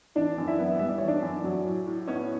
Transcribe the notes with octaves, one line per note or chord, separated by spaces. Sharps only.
E3 D4 D5
F#2
E4 E5
B3
G3 E5
D5
E3 C#5
D4 D5
F#2
F#3
A2
A2
B3 C#4 C#5